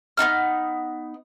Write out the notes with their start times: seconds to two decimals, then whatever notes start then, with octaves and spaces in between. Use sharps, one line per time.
0.17 B3 C4 D#4 F6